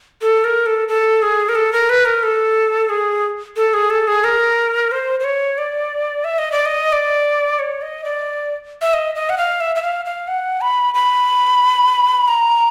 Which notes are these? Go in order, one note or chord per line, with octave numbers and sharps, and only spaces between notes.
A4
A#4
A4
A4
G#4
A#4
A4
A#4
B4
A#4
A4
G#4
A4
G#4
A4
G#4
A#4
C5
C5
C#5
D5
E5
D#5
D5
D#5
D5
C#5
D#5
D5
E5
D#5
D#5
F#5
F5
E5
E5
F5
F5
F#5
B5
B5
A#5